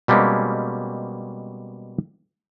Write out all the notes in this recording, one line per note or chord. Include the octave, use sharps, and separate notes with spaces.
B2 G3 G#3 A#3 C4 C#4